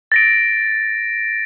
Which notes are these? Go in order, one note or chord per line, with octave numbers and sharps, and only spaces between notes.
A6 A#6 D7